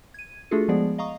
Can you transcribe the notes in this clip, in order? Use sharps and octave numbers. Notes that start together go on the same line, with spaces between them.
G#6 D#7
A3 D4 F4 F#4 G#4 A4
F3 G#3 B3 G#4 D5
D#5 F5 A#5 C#6 D#6